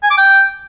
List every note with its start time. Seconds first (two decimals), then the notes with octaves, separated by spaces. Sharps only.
0.03 G#5
0.10 D6
0.18 G5